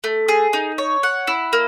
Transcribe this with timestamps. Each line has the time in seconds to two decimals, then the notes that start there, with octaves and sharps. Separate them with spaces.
0.04 A3
0.29 G#4
0.53 D#4
0.78 C#5
1.03 F#5
1.27 E4
1.53 A#3